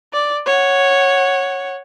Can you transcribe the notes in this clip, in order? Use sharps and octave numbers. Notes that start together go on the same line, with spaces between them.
D5
C#5 F#5